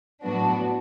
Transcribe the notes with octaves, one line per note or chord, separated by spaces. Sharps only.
A2 F#3 B3 D4 F#4